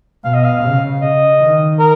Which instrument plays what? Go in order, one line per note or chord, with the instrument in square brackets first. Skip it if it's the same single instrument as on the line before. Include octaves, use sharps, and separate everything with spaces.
[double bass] B2 [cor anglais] F5
[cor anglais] D#5
F5
[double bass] C#3
[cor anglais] D#5
[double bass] D#3
[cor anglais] A#4